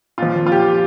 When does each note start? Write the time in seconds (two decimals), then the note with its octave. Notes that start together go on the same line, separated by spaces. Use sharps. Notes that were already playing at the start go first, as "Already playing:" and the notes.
0.18 A#2 F3 F4
0.46 F4
0.52 G4